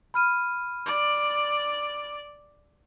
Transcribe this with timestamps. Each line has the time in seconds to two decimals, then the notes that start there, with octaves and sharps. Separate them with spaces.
0.14 B5 F6 D#7
0.86 D5